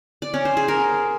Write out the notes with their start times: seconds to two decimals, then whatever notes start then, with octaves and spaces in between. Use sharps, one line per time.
0.22 D5
0.34 C#4
0.45 C5
0.57 G#4
0.68 A#4